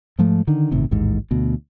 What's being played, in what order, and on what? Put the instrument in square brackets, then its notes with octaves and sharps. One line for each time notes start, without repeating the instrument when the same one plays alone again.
[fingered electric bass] G#2 F3 A3
D3 D#3
G1 A2 C3 D#3
A1 D#2 G#2
D2 B2